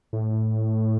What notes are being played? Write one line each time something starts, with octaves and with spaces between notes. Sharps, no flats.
A2